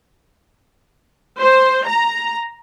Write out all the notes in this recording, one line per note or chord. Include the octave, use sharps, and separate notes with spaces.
C5
A#5